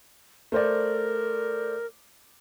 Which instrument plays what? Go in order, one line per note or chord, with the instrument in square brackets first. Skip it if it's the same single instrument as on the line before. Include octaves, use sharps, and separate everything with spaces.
[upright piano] A3 C5 D5 [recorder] A#4